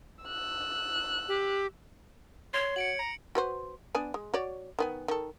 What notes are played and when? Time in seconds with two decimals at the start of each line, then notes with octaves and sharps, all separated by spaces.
0.25 E6 F#6
1.28 G4
2.54 C#5 C6
2.76 F#4 C#7 D7 F#7
2.99 A#5
3.35 F#4 B4 C5
3.95 B3 D4 G#5
4.14 G#3
4.34 F#4 C#5 D5
4.79 D#3 B3 G#5
5.08 D#3 A4